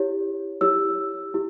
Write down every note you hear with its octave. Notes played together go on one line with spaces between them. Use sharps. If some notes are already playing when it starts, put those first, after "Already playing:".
Already playing: E4 G4 C#5
E4 G4 C#5 E6
E4 G4